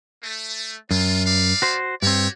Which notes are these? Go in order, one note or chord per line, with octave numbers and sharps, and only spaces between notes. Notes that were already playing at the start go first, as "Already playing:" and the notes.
A3
F#2 D4 F4
B4 D5 F5
F#4 C5
G2 C4 F#4 G4 C#5